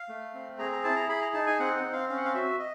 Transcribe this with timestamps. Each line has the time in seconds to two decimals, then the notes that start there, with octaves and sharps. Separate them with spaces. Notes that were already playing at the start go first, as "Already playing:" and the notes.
Already playing: F5
0.09 A3
0.34 C4
0.59 G#4 A#5
0.72 A#5
0.84 E4 A5
0.96 A#5
1.09 G#4 B5
1.21 A#5
1.34 D#4 A5
1.47 G#5
1.60 C4 F#5
1.77 F#5
1.84 C4
1.93 F5
2.09 C#4 F5
2.17 F#5
2.25 F5
2.34 F#4 E5
2.59 D#5